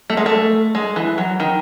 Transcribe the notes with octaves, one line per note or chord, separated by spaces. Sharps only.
A3
G#3
A3
G#3
E3
F#3
D#3